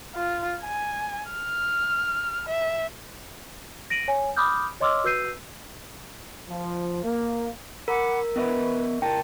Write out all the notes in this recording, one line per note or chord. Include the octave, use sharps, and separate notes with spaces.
F4
G#5
F6
E5
A#6 D7 D#7 F#7
C#5 G#5
B5 D6 D#6 F6 G6
C#5 D#5 C6 D6 E6 F6
F#4 B4 E6 G6 C7 D#7
F3
A#3
A#4 F#5 B5 D6
B3 B4 D#5 E5
C3 A#4 G5 A5